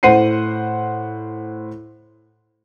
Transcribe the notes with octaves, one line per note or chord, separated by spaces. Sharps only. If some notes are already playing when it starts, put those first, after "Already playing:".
A2 C5 F#5 C7 D#7